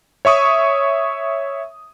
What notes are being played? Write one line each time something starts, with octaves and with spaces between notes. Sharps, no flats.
C#5 E5 C#6 D#6